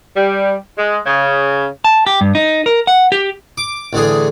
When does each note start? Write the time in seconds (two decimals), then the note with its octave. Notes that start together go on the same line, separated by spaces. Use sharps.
0.16 G3
0.78 G#3
1.06 C#3
1.84 A5
2.07 G4
2.21 G2
2.35 D#4
2.66 A#4
2.87 F#5
3.12 G4
3.58 D6
3.93 A1 D3 G#4